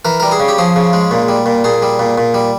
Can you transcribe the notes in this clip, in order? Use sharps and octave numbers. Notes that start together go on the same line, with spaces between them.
E3 A#4
G3 A#4
G#4
C#3
G4
F3 G#4
C#3
G#3
A#2
G3
A#2
A#2 G#4
G3
A#2
A#2
G3